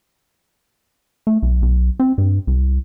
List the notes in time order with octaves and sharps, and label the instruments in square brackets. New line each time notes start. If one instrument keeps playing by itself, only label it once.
[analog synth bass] A3
B1
B1
C4
G2
C2